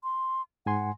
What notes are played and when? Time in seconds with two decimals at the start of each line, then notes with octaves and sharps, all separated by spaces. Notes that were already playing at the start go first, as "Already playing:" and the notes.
0.04 C6
0.66 G#2 F#5 G#5 C6